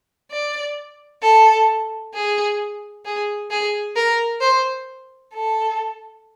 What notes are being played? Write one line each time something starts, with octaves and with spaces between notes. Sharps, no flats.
D5
A4
G#4
G#4
G#4
A#4
C5
A4